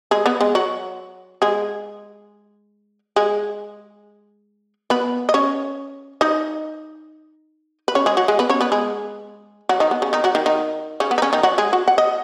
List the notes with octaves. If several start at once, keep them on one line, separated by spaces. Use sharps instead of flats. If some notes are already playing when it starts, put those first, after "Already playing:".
G#3 G#4
B3 B4
G#3 G#4
F#3 F#4
G#3 G#4
G#3 G#4
B3 B4
D#5
C#4 C#5
D#4 D#5
B4
C#4 C#5
G#3 G#4
F#3 F#4
G#3 G#4
B3 B4
C#4 C#5
B3 B4
G#3 G#4
F#3 F#4
D#3 D#4
B3
C#3 C#4
D#3 D#4
F#3 F#4
D#3 D#4
D#3 D#4
C#3 C#4
B3
D#4
C#3 C#4
D#3 D#4
F#3 F#4
G#3 G#4
F#4 F#5
F#5
D#5